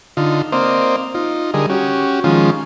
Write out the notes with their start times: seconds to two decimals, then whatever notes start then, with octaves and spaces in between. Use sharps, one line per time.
0.17 D3 D#4 F4
0.52 A#3 C4 C5 D5 D#5 F5
1.15 D#4 F4
1.54 D3 G3 G#4 A#4 D#5
1.70 C#4 F#4 G4
2.24 D#3 F3 G#3 C#4 F4